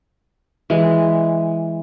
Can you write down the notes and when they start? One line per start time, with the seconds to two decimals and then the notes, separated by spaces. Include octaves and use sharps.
0.70 E3 G#3